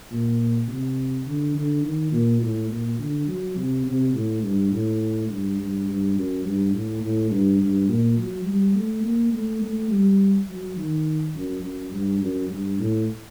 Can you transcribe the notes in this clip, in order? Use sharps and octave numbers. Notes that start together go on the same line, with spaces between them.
A#2
C3
D3
D3
D#3
A#2
A2
A#2
D3
F#3
C3
C3
A2
G2
A2
G2
G2
G2
F#2
G2
A2
A2
G2
G2
A#2
F#3
G3
A3
A#3
A3
A3
G3
F#3
D#3
F#2
F#2
G2
F#2
G2
A2